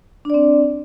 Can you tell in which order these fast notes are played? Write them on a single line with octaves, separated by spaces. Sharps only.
D4 D5 C4